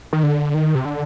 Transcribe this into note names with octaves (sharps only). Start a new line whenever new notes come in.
D#3
D3
D#3
C3
D3